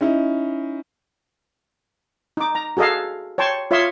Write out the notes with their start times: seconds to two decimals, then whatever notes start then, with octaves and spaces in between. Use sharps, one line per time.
0.01 C#4 D#4 E4
2.37 D#4 D6
2.55 A#5
2.77 F#4 G#4 A4 D#5 F5
3.38 C#5 G5 A5 C6 C#6
3.71 F4 C#5 E5 F5 C6 D#6